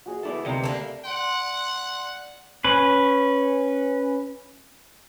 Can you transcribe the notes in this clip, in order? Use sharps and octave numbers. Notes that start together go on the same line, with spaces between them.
F#4 G#4 D#5
B3 E4 A4 D5 E5
D2 C3 G3 B3 G4 A#4 D#5 G5
A#3 D4 A4 E6
D5 F#5 C6
C#4 B4